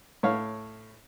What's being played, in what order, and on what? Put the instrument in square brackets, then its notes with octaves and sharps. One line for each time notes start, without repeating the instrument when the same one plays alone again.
[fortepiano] A2 C#5 F5